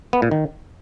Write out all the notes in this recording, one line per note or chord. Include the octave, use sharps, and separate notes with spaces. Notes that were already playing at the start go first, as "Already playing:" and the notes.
B3
A#2
D#3